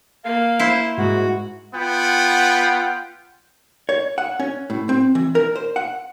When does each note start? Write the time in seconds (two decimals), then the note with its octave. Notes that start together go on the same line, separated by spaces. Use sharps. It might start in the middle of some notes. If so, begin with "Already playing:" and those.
0.24 A#3 F5
0.59 E4 C5
0.98 G#2 F#4
1.75 B3 F4 F#5 G5
3.89 C#5
4.18 F#5
4.40 C#4
4.70 A2
4.89 C4
5.15 E3
5.35 A#4
5.56 C5
5.76 F#5